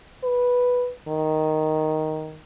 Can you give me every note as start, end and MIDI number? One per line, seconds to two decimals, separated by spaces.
0.24 0.91 71
1.08 2.39 51